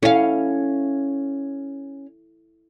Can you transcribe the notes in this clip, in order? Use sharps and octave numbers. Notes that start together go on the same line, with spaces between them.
C#4 E4 A4 F5